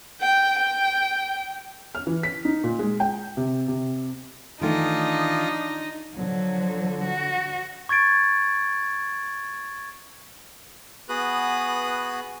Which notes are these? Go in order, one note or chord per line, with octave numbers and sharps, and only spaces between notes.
G5
G5
F6
E3
B6
D#4
A#2
G#3
G5
C3
C3
D#3 E3 A3 D4 D#4 F4 D#6
D3 F3 F#3
F#4
C#6 G#6 A6 D7
B3 F#4 G#4 B4 D#6 F#6